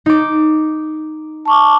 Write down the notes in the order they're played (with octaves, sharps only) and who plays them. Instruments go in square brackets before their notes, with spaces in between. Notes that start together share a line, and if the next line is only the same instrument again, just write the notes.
[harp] D#4 D6
[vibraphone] A5 C#6 D6